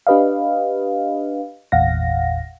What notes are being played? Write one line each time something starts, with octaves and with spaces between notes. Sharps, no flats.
D4 G4 B4 D#5 F5
G#1 E2 A#2 F5 F#5 A#6